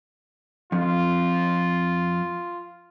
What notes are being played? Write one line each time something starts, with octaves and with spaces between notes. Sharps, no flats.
F2 F4